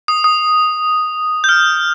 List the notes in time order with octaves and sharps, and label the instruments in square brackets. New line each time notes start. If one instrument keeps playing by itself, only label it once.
[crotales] D#6
D#6
G6
F6